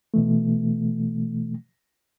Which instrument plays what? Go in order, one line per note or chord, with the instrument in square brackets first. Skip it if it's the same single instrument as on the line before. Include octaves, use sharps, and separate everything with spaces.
[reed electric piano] B2 E3 A3